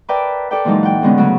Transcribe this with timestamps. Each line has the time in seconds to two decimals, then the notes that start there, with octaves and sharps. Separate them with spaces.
0.08 A#4 B4 D5 E5 G5 A5
0.51 A4 D5 G5
0.65 A#2 E3 F#3 G#3 D#4 A5
0.83 F#5 G5
1.02 A2 D3 G#3 B3 C#4
1.17 C#3 F#3 A3 F#4 G#4